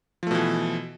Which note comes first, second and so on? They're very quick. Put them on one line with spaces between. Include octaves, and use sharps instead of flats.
F3 A3 B2 E3